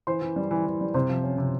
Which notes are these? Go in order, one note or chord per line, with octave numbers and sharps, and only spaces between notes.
E3 C5 C6
E3
G3
E3
E3
G3
C3 C5 C6
F3
C#4
C3